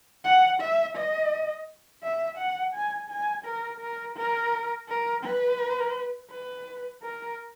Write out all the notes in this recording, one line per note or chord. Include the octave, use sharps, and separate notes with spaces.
F#5
E5
D#5
E5
F#5
G#5
G#5
A#4
A#4
A#4
A#4
B4
B4
A#4